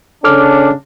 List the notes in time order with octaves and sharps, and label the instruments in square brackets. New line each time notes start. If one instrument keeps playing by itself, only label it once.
[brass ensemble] C#3 C#4 D4 [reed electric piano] A4 D6 F6